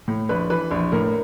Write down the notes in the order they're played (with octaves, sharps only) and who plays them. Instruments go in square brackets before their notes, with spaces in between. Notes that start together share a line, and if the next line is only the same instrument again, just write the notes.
[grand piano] A2
A#1 B4
E3 B4
A#1
A2 A#4